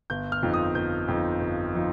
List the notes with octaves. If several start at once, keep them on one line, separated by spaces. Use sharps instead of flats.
G1 G6
F6
F2 F3 D#4
D#6
G1 G6
F2 F3 D#4
G1
F3 D#4